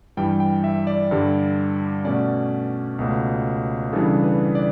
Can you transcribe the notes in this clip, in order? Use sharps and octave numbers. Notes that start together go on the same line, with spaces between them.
G2 E3 G3 G5
G5
E5
D5
G2 D3 G3
B2 A3 C#4 D5
C#2 B2 A3
C#3 E3 G3 D4 A4
B4
D5